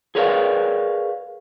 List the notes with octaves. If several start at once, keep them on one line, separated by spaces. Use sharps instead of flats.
G#4 A#4 B4 C#5 D5 F5